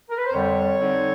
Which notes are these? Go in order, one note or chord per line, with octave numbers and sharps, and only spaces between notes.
A#4
B4
C5
F2 D3 G3 C#5
D3 G3 C4 D#4